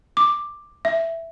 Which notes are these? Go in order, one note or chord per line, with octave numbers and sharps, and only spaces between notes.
D6
E5